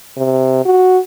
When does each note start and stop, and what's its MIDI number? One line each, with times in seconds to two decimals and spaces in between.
0.17 0.63 48
0.65 0.98 66